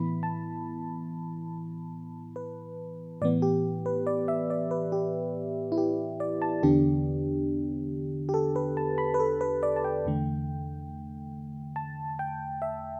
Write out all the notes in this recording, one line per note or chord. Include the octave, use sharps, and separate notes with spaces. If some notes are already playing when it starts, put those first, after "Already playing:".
Already playing: A2 E3 B3 E4 B5
A5
B4
A2 E3 B3 D5
G4
B4
D5
E5
D5
B4
G4
E4
G4
D5
A5
E2 D3 B3 D4 G4
G4
A4
B4
A5
B5
B4
A4
B4
D5
A5
G5
E2 D3 A3
A5
G5
E5